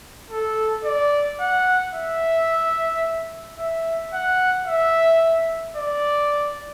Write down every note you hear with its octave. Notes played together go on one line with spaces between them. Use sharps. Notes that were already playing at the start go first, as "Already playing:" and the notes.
A4
D5
F#5
E5
E5
F#5
E5
D5